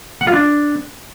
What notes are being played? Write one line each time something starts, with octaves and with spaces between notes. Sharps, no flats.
F#5
F4
D4